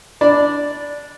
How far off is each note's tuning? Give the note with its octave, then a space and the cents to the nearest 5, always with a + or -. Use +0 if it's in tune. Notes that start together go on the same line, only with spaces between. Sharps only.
D4 -10 D5 +0 B5 +0